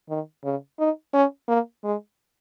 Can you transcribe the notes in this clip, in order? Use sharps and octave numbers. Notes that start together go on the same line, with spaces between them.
D#3
C#3
D#4
C#4
A#3
G#3